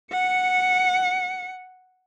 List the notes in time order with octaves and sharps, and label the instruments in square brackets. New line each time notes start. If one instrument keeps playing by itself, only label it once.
[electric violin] F#5 C#7